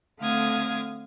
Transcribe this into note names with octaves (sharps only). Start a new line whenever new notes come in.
D3 A3 C4 F5 D#6 G#6